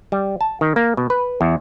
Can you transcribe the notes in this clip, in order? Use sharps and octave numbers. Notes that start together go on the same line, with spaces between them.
G3
A5
D#3
A#3
B2
B4
E2